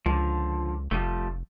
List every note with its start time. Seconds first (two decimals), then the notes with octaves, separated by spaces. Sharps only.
0.06 C#2 D3 F3
0.91 F1 F3 G3 A3